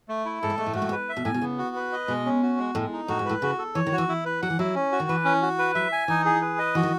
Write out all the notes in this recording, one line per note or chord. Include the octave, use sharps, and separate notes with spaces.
A3
E4
G#2 A4
A2
G#2 A3
A2
G#2 F#4
A2
G#2
B4
E5
B2
A2 G#5
B2
C#3 B3
F#4
B4
D#5
B2 G#3
C#4
F#4
G#3
A2 G#3
D#4
A2 F#4
G#2
A2 B4
C#3 F#4
A4
E3 C#5
D#3
F#4
E3
E4
B4
F#3 F#5
E3
F#3 E4
C#4
F#4
D#3
E3 B4
C#4
F#4
B4
F#3 E5
G#5
E3 D#4
G#4
B4
D#5
E3 F#4
D#3